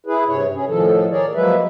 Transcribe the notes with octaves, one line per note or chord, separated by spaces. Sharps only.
E4 G#4 B4
G2 C3 C#5
C#4 G#4
A2 D#3 F3 A4
G#4 A#4 C#5 D5
F3 F#3 G#3 A#3 B4 E5